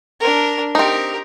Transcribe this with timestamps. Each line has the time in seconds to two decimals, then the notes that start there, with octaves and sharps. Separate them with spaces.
0.20 D4 A#4
0.75 C4 D#4 G4 A#4